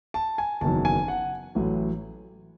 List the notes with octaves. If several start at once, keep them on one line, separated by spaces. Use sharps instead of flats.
A5
G#5
F#1 E2 D#3 F#3 A5
G#5
F#5
A1 A2 F#3